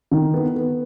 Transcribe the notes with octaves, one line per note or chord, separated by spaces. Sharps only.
D#3
B3
B3